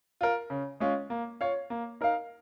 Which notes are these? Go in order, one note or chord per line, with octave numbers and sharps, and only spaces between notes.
F4 A#4
C#3
G#3 C#4 F4
A#3
F4 C#5 F5
A#3
D#4 A#4 F5